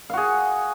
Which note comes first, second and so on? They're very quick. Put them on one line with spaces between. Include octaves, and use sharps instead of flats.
F5 F#4 G#4